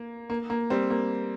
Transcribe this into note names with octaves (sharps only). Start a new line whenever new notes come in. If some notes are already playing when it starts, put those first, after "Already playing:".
Already playing: A#3
A#3
A#3
G3 C4
A#3